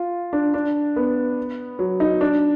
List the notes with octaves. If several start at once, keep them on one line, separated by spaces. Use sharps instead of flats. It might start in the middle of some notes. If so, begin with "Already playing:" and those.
Already playing: F4
D4
D4
B3
F#3
D#4
D4